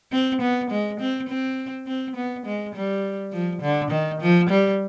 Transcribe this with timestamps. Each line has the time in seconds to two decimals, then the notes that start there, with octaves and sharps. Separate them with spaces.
0.12 C4
0.41 B3
0.70 G#3
1.00 C4
1.29 C4
1.87 C4
2.16 B3
2.46 G#3
2.75 G3
3.32 F3
3.62 D3
3.91 D#3
4.21 F3
4.50 G3